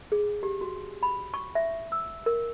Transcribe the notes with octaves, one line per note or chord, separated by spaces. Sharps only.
G#4
G4
F#4
B5
C#6
E5
E6
A#4